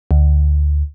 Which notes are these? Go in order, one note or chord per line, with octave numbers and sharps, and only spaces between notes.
D2